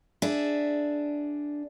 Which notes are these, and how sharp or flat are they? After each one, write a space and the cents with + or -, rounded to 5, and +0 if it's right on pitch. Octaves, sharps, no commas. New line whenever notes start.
D4 +0 G#4 +0 E5 +0